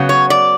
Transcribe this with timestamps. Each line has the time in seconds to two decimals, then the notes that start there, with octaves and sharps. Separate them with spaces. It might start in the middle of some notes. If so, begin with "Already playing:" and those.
Already playing: C#3 F#3 B3
0.09 C#5
0.30 D5